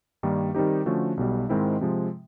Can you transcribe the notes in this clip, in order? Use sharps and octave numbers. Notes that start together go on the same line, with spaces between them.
G2 D#3 G3 A#3 D#4
D#3 G3 C4 D#4 G4
D3 F3 A3 C#4 F#4
B1 B2 G3
G#2 D#3 G#3 C4 E4
C3 F3 G#3